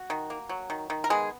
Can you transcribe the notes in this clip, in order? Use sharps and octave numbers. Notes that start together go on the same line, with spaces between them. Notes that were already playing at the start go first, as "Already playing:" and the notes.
Already playing: F#4
D#3
A#3
F#3
D#3
D#3
A#4
G#3 B3 G#4